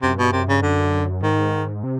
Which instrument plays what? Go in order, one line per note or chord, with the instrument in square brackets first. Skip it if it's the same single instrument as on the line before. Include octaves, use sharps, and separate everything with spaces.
[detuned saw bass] F#2 [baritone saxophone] C3
[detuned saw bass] G2 [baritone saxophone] B2
[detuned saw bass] F#2 [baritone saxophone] C3
[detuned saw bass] G2 [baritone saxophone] C#3
[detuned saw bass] F#2 [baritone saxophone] D3
[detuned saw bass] G#2 [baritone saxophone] D#3
[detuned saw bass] C3